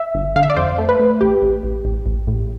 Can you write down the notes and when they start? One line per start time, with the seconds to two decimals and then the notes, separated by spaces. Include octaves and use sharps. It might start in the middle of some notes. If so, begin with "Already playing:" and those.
Already playing: E5
0.14 G1
0.36 D3 F5
0.43 E5
0.50 D5
0.56 F2 C5
0.78 A3
0.89 B4
0.99 A3
1.21 A1 G4
1.42 A1
1.63 A1
1.85 A1
2.06 A1
2.27 A2